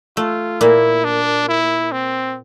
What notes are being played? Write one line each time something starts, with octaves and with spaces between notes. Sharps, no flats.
A3 F4
A#2 A#3 E4
D4
E4
C4